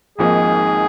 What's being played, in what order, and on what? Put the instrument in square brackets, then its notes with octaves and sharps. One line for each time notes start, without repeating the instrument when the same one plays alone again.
[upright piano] G#1 G#2 F3 A#3 D#4 [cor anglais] G#4